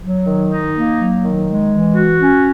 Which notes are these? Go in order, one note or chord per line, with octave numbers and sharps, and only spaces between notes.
F#3
D#3
D#4
A#3
F#3
D#3
G#3
E3
F#4
C#4